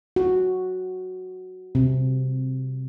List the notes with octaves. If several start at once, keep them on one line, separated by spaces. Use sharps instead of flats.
F#4
C3